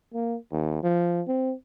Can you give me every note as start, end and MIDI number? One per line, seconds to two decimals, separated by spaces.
0.14 0.37 58
0.52 0.82 39
0.83 1.22 53
1.27 1.54 60